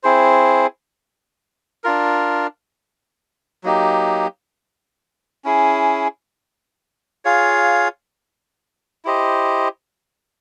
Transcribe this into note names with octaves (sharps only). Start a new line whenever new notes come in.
C4 E4 G#4 C5
D4 F4 A#4
F#3 A#3 D#4 G4
C#4 E4 G#4
F4 G#4 C#5 F5
E4 G4 C5 D#5